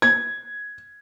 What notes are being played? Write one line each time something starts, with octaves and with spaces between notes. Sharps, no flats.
G#6